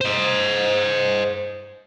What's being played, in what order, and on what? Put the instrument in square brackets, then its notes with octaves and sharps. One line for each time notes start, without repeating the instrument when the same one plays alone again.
[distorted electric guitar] C5 D#5